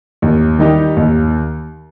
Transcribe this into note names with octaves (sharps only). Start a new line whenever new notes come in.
D#2
D#3 G3 D#4 G4
D#2